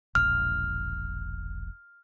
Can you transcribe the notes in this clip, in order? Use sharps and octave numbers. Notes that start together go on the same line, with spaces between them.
E1 A#1 F6